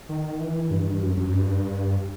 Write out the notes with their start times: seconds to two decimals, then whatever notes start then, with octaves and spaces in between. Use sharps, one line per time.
0.09 D#3
0.40 E3
0.71 G2
1.02 F#2
1.17 F#2
1.33 G2